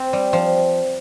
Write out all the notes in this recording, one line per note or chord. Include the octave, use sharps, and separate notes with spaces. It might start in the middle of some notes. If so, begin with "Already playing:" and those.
Already playing: C4
G3
F3